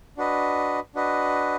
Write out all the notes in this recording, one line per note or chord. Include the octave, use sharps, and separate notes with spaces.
D4 F#4 B4 D#5
D4 F#4 B4 D#5